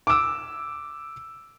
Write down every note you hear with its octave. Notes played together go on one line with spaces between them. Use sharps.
D6 E6